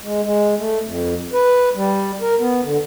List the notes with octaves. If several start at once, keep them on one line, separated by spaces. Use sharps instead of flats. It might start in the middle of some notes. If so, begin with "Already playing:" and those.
G#3
G#3
A3
F2
B4
G3
A#4
B3
D3